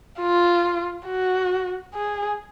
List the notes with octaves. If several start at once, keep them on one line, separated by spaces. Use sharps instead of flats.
F4
F#4
G#4